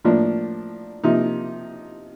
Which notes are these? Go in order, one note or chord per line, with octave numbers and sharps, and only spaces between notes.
A2 F3 A#3 D4
C3 F3 A#3 D#4